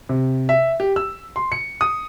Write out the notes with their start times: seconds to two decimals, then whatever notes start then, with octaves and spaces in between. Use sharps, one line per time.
0.09 C3
0.49 E5
0.80 G4
0.96 E6
1.36 C6
1.52 C#7
1.81 D#6